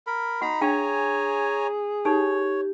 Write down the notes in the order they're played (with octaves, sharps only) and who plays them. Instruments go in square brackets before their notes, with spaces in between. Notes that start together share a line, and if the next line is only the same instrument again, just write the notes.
[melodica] A#4 B5
[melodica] D#4 A#5 B5 [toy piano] F#4 F#5
[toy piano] D4 F5 G5 [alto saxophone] G#4 [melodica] C#5 G#5 A#5
[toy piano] D#4 A4 [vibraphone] G4 [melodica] C#5